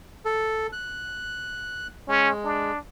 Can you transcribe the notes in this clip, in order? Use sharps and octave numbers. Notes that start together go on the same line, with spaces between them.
A4
F#6
G#3 C#4
D4